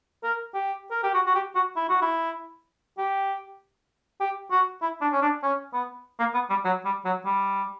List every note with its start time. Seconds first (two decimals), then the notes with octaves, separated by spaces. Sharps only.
0.23 A#4
0.54 G4
0.91 A#4
1.04 G4
1.14 F#4
1.26 F#4
1.35 G4
1.55 F#4
1.76 E4
1.89 F#4
2.02 E4
2.98 G4
4.20 G4
4.51 F#4
4.82 E4
5.01 D4
5.13 C#4
5.22 D4
5.43 C#4
5.73 B3
6.19 A#3
6.34 B3
6.50 G3
6.65 F#3
6.85 G3
7.05 F#3
7.26 G3